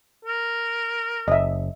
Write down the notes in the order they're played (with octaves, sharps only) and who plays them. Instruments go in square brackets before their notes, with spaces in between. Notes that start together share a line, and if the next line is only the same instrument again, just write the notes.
[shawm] A#4
[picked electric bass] F#1 [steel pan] D#5 E5